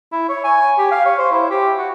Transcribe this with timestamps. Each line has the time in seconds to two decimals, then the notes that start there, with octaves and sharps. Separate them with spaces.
0.12 E4
0.29 C#5
0.44 G#5
0.78 G4
0.92 F5
1.06 C#5
1.18 C5
1.32 E4
1.50 G4
1.78 F#4